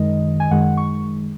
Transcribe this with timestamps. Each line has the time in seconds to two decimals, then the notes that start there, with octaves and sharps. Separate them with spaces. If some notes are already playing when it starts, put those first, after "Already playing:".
Already playing: F#2 D#3 G#3 D#5
0.40 G#5
0.51 F#2 D#3 G#3 F#5
0.77 C#6